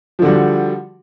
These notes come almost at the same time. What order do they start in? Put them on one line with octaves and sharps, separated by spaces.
F3 D3 F#4 G3